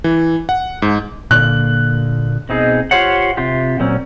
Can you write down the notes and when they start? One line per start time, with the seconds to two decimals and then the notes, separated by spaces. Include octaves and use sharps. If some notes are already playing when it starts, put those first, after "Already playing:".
0.04 E3
0.49 F#5
0.82 G#2
1.31 A#2 D3 A#3 F#6
2.49 B2 C4 D#4 G#4
2.91 F4 G4 C5 C#5 F#5
3.37 C3 F4 G4
3.80 A#2 F#3 C4 C#4